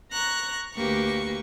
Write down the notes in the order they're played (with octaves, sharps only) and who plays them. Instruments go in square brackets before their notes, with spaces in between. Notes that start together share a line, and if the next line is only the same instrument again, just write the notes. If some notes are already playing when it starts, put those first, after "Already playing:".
[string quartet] A#5 C#6 F#6
D2 A#3 G4 B4 C#6